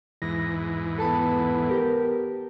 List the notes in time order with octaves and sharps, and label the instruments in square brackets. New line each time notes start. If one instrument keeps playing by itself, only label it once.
[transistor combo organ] E2 G#2 E3 [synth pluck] A#6
[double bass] B3 [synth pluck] A4 A5 B5
[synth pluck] G4 A#4